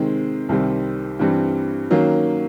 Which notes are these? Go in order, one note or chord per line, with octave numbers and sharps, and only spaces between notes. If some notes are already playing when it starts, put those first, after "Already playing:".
Already playing: C3 D#3 G#3 C4
C2 C3 D#3 G3 C4
G2 E3 G3 C4
D#3 F#3 A#3 C#4